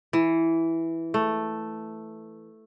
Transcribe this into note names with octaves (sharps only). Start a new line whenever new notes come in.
E3
A3